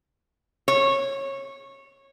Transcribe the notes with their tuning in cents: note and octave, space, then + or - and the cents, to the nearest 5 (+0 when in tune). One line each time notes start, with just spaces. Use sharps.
C#5 -20